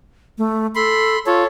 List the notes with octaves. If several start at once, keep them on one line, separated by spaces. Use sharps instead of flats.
A3
A4 B5 C6
F4 A4 C#5